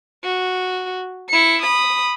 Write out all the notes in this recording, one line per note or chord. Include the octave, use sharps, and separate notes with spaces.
F#4
E4 C#7
B5 D#6